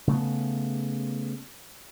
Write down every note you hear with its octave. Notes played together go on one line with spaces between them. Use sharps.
C#3 A3 B3